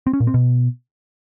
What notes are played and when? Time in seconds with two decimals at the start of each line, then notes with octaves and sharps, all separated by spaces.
0.07 C4
0.13 C#4
0.20 A#2
0.27 C4
0.34 B2